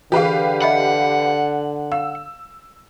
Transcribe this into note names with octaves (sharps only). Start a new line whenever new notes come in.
D3 E3 G4 G#4 B4 F5
D#5 E5 F#5 B5
F5 E6